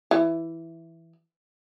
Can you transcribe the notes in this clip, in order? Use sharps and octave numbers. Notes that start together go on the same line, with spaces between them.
E3